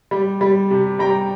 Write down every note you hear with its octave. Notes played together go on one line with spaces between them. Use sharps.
G3
G3
C3
G3 G5 A#5